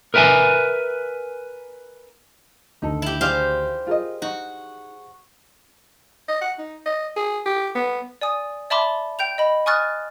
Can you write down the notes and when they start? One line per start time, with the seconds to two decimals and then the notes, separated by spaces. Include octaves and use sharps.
0.14 A#4 B4 E5 G5 G#5
2.82 D2 D#3 D#4 A4
3.02 E4 G4
3.21 D#4 G4 G#4 C5 D5 F5
3.87 F4 G#4 A#4 D#5
4.22 D#4 F#4
6.28 D#5
6.41 F#5
6.58 D#4
6.86 D#5
7.16 G#4
7.46 G4
7.75 B3
8.21 D5 G#5 D#6
8.70 D5 E5 A5 B5 C6 D6
9.19 G5 G6 F7
9.38 D#5 B5
9.66 G#5 C#6 D#6 F6 F#6 A6